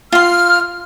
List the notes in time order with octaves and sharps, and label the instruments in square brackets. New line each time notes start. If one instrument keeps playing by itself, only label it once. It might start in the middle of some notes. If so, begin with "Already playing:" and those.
[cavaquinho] F4 C6 [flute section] F6